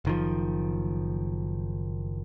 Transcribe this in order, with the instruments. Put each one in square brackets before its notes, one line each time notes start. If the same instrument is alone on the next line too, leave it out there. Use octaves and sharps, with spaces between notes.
[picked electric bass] F#1 D#3 F3